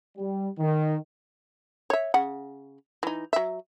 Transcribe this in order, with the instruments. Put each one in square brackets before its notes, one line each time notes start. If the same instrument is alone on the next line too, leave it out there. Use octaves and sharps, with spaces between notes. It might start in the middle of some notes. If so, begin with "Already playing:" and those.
[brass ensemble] G3
D#3
[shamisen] C#5 E5
C#3 F#5
E3 D#4
F#3 E5